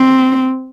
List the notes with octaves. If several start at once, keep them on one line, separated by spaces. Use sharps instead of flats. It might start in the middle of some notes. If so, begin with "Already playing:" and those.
Already playing: C4